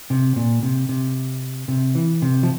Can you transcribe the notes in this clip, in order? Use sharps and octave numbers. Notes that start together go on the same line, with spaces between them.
C3
A#2
C3
C3
C3
E3
C3
F3